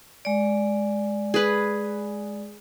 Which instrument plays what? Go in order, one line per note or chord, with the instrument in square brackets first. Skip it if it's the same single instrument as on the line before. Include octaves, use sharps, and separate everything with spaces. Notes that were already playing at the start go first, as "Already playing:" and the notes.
[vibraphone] G#3 D5
[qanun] G#4 B4